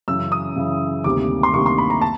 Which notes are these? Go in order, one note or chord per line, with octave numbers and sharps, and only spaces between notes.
F#2 C#3 E3 E6
D#6
F#2 C#3 E3
D2 C3 D#3 G3 A#3 D6
C6
D2 C3 D#3 G3 A#3 C#6
C6
B5
A#5
A5